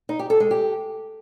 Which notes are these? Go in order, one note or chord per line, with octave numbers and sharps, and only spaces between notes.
D#4
G4
A4
G#3
G4